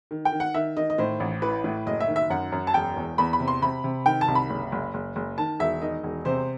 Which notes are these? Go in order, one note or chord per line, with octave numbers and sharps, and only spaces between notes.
D#3
G5
D#3
F#5
D#3 E5
D#3 D#5
D#5
A2 C5
A1
E3 B4
A2
F#1 D#5
E5
D#3
E5
F#2 F#5
F#2
A5
E1 G5
E2
E2 B5
B5
C3
C6
C3 B5
C3
D#3 G5
A5
C2
B5
F#1
F#1
F#1
F#1
D#3 A5
E1 E5
D#3 D#5
E1
C3 C5